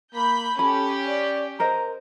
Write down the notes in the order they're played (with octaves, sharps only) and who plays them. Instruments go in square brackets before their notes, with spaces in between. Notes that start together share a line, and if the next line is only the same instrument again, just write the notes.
[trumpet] A#3 [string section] B5 G6
[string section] C#4 G4 [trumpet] A4 [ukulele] B5
[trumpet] D5
[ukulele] A#4 C5 D#5 [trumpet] A#5